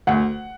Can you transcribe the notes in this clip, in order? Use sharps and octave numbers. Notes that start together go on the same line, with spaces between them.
D2 F#5